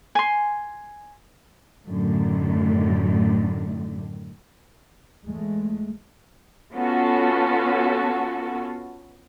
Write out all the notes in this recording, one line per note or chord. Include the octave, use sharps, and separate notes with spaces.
G#5 C6
F#2 A2 D3 D#3
E2 G#3 A3
B3 C#4 F4 F#4 A4